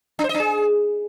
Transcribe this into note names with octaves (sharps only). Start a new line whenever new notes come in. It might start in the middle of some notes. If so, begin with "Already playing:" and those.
D4
C5
D#5
D4
G#4